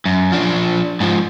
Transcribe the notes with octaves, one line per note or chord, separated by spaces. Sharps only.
F#2
F3 D4
G#2 F3